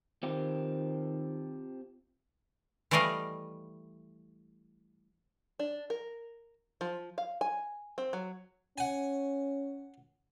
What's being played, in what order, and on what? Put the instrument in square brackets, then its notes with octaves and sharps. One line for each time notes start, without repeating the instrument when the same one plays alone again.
[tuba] D#3 [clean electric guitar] C4 F4 G4
[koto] E3 G3 A3 D5 D#5 F5
[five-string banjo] D4
A#4
F3
F5
G#5
C4
F#3
[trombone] C#4 [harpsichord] F#5 G#5